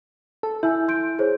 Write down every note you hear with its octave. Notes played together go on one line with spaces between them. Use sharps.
A4
E4 G#5 E6 G6
C6 G6 D7
G#4 C5 C#5